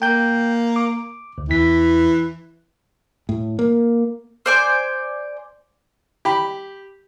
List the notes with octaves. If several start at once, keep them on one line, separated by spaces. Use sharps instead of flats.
A#3 G5 G6
D6
D2
E2 E3 B6
A2
A#3
C5 D5 G#5
G4 B5